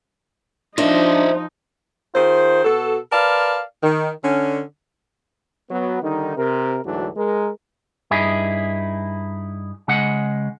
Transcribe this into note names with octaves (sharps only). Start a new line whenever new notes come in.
F3 D4 D#4 F4 C5 D#5 E5
D#3 F4 G#4 C5
B2 F#4 A4
A#4 B4 D5 F5 A5
D#3
D3 C#4
F#3 B3
D3 D#3 G3 D#4
C3 A#4
D2 G#2 E3 F#3 D4
G#3 A#4
G2 D#4 E4 G#4
C#3 G#3 F#5